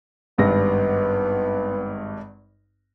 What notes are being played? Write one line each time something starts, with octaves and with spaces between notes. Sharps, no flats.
G#1 G2 B3 A#6